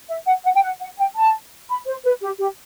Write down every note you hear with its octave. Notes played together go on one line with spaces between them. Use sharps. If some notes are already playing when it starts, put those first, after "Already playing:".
E5
F#5
F#5
G5
F#5
F#5
G5
A5
B5
C5
B4
G4
G4